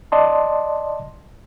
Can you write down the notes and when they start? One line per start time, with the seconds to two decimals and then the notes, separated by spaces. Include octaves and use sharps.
0.12 D5 D#5 A5 C6